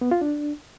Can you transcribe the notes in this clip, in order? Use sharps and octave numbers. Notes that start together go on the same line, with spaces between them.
B3
F4
D4